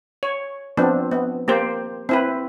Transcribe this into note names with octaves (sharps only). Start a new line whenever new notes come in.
C#5
F3 B3 C4 D4
B3
A#3 G4 C5
C4 E4 B4